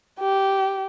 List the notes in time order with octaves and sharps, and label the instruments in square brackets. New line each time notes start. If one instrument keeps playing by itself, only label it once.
[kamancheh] G4